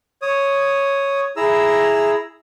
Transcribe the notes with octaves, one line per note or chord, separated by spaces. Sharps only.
C#5 D#6
E4 G#4 A#5 E6